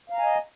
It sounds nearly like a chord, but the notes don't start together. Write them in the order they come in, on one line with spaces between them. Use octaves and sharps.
F5 A#5 G#5 D#5